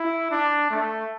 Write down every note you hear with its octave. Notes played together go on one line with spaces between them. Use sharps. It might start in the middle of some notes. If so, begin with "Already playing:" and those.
Already playing: E4
D4
A3